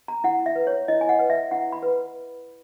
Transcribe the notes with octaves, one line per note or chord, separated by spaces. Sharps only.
A#5
E4 F#5
E5
B4
C#5
E4 D#5
G#5
F#5
B4
E5
E4 F#5
B5
B4